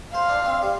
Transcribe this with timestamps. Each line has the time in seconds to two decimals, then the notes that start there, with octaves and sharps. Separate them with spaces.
0.14 C5 F5
0.29 D4
0.46 C4
0.62 G3